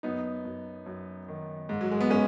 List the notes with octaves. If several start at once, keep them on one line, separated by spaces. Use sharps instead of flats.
F#2 B3 D#4
F#2
F#2
D#3
G#2
F#3
G#3
B3
G#3 C#4